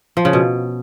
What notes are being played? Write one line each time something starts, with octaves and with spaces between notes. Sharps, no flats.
F3
C#3
B2